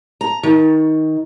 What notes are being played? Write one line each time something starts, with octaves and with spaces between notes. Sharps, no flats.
A#5
D#3